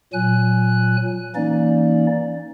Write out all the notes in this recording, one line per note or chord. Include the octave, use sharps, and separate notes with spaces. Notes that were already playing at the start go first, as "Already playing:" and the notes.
A#2 F#3 G#5 F#6
E3 A#3 C#4 D#4 D5